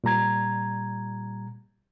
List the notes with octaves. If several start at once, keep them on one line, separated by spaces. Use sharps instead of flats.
A#2 G3 A#5 G#6